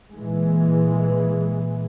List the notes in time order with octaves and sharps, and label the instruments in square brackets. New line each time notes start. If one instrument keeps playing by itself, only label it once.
[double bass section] A#2 E3 G#3